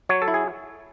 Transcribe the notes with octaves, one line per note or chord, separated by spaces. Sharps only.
F#3 C#5
A4
E4
G#4